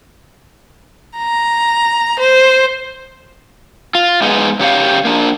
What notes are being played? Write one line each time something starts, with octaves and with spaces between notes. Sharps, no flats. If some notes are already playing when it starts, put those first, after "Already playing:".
A#5
C5
F4
G#3 B3 D#4
C#3 G4 C#5 F5
A#3 D4